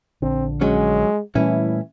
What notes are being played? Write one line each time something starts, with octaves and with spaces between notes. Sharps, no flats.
A#1 D3 C4
F#3 G#3 C#4
A#2 E3 G3 A3 C#4 E4